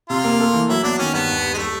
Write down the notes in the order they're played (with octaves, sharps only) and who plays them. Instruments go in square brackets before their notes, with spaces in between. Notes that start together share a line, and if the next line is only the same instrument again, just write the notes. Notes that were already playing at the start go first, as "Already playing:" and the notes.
[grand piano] C3 [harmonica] F4
[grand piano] A#3
A3
E3
[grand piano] F#3 [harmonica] E4
[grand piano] B3 [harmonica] D4
[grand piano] D#3 [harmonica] C#4
[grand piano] G2 [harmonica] B3
[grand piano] D#2
D#2
[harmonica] G#3
[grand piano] G3 [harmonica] A3